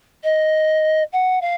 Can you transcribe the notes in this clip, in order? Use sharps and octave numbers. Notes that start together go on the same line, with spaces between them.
D#5
F#5
F5